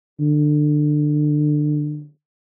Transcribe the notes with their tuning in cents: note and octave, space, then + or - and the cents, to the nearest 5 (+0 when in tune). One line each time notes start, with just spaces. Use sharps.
D3 +25